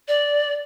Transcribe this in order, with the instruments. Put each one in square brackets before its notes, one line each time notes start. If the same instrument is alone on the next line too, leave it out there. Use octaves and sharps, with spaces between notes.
[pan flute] D5